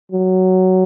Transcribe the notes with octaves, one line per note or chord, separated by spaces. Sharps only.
F#3